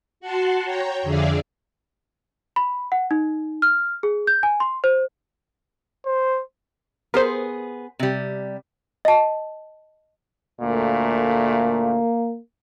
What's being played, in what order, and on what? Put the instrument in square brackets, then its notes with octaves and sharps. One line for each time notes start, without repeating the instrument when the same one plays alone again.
[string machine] F#4 F#5 A5 C6
C#5 G5 A#5
F2 D3 G#4 D5 E5 F5
[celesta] B5
F#5
D#4
F6
G#4
G6
G#5
C6
C5
[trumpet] C5
[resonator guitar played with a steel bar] B3 G#4 [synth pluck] A#4 C5
[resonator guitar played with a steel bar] C3 G3
[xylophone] D#5 A5
[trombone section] D2 A#2 A3 [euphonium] A#3